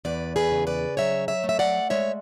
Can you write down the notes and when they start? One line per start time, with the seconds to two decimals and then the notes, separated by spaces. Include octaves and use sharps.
0.05 E2 B4 D5
0.36 G#4 B4
0.51 C#3
0.67 B4 D5
0.97 F#3 C#5 E5
1.28 C#5 E5
1.44 A3
1.49 E5
1.59 D5 F#5
1.90 G#3 C#5 E5